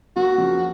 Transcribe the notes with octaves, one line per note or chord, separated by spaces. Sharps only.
F#3 A#3 F#4
C#3 F3